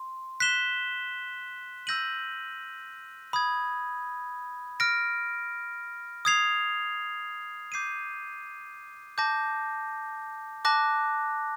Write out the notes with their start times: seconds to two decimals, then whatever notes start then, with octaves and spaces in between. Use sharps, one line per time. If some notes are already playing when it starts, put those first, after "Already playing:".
Already playing: C6
0.40 F#6 B6 E7 G7
1.87 E6 G6 A#6 D#7 F#7
3.33 B5 D#6 G#6
4.80 F6 A#6 D7
6.25 D#6 G#6 C7 F7
7.72 D6 G6 C7 D#7
9.18 A5 D6 G6 A#6
10.65 A5 D6 F#6 A#6